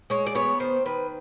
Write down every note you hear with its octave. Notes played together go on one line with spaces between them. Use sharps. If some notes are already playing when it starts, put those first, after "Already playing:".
G#3 C#5
D5
B3 C#5
D#3 C5
D#3 B4